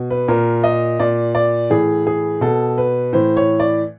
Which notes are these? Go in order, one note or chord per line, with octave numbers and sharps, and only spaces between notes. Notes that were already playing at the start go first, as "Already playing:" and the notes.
Already playing: B2
B4
A#2 A#4
D#5
A#2 D5
D5
A2 E3 G#4
G#4
B2 A4
B4
A2 E3 C5
C#5
D5